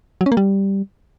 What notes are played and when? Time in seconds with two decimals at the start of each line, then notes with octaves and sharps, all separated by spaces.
0.21 F#3
0.26 C#4
0.32 A#3
0.37 G3